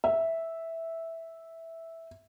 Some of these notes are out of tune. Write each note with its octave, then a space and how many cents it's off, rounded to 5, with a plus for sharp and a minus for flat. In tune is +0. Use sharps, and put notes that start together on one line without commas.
E5 -5